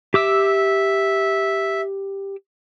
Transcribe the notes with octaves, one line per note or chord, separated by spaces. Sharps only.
G4 E5 D6 E6